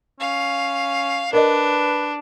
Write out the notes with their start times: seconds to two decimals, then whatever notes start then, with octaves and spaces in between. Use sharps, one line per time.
0.20 C#4 F5
1.33 D4 A#4 B4 D5 D#5